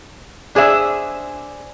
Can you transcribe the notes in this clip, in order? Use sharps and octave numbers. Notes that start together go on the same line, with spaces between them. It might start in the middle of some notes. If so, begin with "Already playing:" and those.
D4 G#4 C5 E5